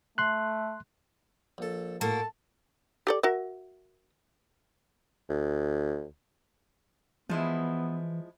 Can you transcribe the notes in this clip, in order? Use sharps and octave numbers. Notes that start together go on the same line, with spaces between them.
A3 C6 F#6
A#1 A4
A2 A#3 F#4 A4 A5
G4 A4 D5
F#4 A#4 E5
D2
E3 F3 G#3 B3 E4